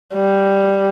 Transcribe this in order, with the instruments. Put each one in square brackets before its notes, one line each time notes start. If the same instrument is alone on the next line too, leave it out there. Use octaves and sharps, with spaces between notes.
[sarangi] G3